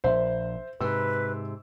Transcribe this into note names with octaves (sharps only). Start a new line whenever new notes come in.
A#1 C5 E5
G#2 C3 B4 E6